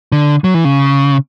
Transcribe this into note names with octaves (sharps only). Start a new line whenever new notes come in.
D3
F#3
E3
C#3